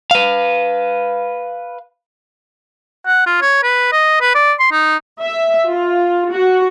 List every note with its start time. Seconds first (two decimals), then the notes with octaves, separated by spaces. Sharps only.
0.11 B4 F5
3.06 F#5
3.26 F4
3.42 C#5
3.63 B4
3.93 D#5
4.21 B4
4.35 D5
4.60 C6
4.72 D#4
5.21 E5
5.69 F4
6.32 F#4